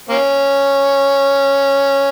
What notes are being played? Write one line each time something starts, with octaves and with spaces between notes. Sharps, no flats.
A#3 C#4